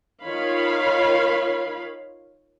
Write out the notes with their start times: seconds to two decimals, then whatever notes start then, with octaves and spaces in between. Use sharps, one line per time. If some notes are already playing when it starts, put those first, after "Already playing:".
0.23 D#3 F4 C#5 F5 B5